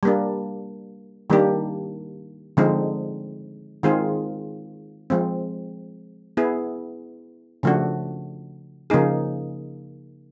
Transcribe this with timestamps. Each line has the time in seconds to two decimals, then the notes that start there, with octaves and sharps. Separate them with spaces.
0.03 G3 A#3 D4
1.30 D#3 G3 A#3 D4 G4
2.57 D3 F3 G#3 C4 D#4
3.83 D#3 G#3 C4 F4 G#4
5.10 F3 G#3 C4
6.37 B3 E4 G#4
7.63 C#3 F3 A3 D4 F#4
8.90 C#3 F3 A#3 D#4 G#4